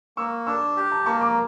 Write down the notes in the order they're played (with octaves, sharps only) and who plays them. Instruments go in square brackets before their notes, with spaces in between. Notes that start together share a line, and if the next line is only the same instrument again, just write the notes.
[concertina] A#3 [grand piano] C#6 E6
[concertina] D4 [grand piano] C#6 E6
[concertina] G4
[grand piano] A5
[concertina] A#3 [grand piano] A5 C#6
[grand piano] A#5 D6